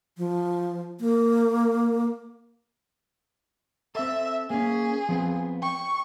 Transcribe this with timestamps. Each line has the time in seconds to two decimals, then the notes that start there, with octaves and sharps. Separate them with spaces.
0.18 F3
1.00 A#3
3.95 C4 A4 E5
4.50 A#3 C#4 G#4
5.09 F3 B3 C4
5.63 G5 C#6